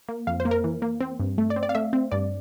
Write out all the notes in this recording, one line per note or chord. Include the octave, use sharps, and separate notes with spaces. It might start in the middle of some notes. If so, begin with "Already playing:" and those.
A#3
F2 F5
C5
A#3
A#4
E3
A#3
C4
G2
A3
D5
C4
D5
F5
A3 E5
C4
G2 D5